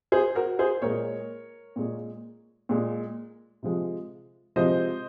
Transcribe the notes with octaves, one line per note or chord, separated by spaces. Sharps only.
G#4 C5
F#4 A#4
G#4 C5
A#2 G#3 A#4 C#5
A#2 G#3
A#2 G#3
C3 F3 G#3
C3 F3 G#3 C5 D#5